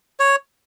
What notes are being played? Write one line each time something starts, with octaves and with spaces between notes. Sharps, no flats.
C#5